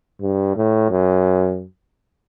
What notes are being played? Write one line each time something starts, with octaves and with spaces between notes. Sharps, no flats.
G2
A2
F#2